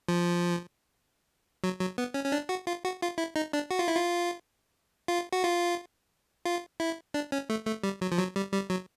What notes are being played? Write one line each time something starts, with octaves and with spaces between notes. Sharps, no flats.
F3
F#3
F#3
B3
C#4
C#4
D4
F#4
F4
F#4
F4
E4
D#4
D4
F#4
F4
E4
F4
F4
F#4
F4
F4
E4
D4
C#4
A3
A3
G3
F#3
F3
F#3
G3
G3
F#3